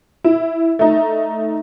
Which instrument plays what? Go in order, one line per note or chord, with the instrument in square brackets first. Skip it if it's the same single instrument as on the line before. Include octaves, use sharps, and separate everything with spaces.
[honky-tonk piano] E4
A3 D#4